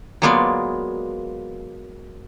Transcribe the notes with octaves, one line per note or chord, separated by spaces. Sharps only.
F#3 G#3 A#3 B3 F4 D5